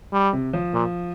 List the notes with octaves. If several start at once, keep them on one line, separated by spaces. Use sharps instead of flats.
G3
C3
F3
A#2